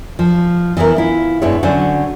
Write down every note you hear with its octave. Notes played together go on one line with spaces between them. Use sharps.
F3
E3 B3 E4 A#4
E4 F4
G2 B2 G#3 B3 E4 C#5
D3 F#3 C#4 C5 F#5